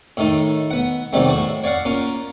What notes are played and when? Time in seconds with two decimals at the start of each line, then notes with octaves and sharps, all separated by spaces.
0.17 A2 D#3 A3 D#4
0.71 B3 F#5
1.13 E2 C3 D#3 F#3 G3 A3
1.30 A2 F#4
1.64 C#5 D5 F5 F#5
1.85 A#3 C#4 F4